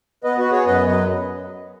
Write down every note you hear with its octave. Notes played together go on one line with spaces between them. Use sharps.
B3 B4 D#5
F#4 B4
B3
G#4 C#5
F#2 B4 D#5
F#3 B4 D#5